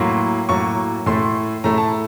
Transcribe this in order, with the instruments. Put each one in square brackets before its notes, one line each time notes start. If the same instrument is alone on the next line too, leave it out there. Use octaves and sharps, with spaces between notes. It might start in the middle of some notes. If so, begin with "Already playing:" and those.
Already playing: [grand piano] A2 F#3 A#3 C6
A2 F#3 A#3 C#6
A2 A3 C6
A2 A3 A#5
A5